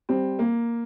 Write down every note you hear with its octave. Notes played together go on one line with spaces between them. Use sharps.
G3 C4
A#3